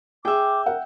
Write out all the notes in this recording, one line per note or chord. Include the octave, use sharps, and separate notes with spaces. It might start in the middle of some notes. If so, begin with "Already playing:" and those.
G#4 E5 G5 D6
A#4 F#5